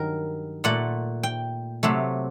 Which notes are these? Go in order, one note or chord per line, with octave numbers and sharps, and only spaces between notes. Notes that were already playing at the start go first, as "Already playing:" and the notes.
Already playing: G2 D#3 F#3 A#4
A#2 A3 F#5
G5
C3 F#3 A3